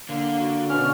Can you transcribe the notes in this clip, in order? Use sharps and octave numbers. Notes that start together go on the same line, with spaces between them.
D3 A#3
D4 F#4
B2 C#4 F6